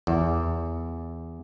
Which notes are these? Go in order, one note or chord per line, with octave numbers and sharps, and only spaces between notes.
E2